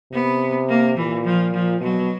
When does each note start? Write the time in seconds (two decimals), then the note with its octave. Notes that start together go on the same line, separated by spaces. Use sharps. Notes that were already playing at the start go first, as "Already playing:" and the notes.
0.12 C3 B3
0.68 A#3
0.97 A#2 E3
1.24 F3
1.53 F3
1.81 B2 F#3